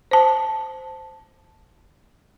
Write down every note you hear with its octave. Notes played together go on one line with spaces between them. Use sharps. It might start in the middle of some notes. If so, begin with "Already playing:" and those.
C5 A5